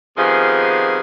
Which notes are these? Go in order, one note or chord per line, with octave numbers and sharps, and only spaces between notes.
C3 D#3 F3 G#3 B3 G#4